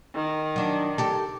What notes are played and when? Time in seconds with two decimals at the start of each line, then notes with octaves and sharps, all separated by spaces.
0.15 D#3
0.56 F#3 D4
0.98 G4 A4